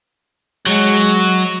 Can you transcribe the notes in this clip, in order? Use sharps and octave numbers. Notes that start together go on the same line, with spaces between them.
F#3 G#3